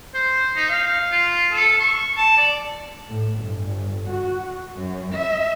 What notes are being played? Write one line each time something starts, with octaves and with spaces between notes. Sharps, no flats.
C5
D#4
F5
F4
A4
C#6
A5
D5
A2
G1
F#4
F#2
E5